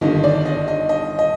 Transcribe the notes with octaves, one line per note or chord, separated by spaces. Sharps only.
G1 G2 D#3 D#5
D5
D#5
D#5
D#5
D#5